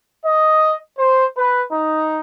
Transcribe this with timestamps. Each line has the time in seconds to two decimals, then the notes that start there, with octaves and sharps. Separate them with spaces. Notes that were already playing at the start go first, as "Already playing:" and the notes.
0.25 D#5
0.98 C5
1.36 B4
1.72 D#4